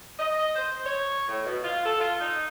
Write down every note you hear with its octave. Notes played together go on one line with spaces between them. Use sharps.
D#5
C5
C#5
A2
B2
F4
A4
F4
D#4